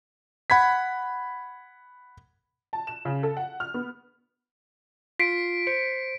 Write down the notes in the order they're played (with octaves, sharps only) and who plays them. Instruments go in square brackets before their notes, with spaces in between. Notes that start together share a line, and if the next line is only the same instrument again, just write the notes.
[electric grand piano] F#5 B5 G#6 B6
[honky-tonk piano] A5
E7
C#3
A4
F#5
F6
B3
[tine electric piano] F4 [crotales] B6 C7 D7
[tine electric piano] C5 C#7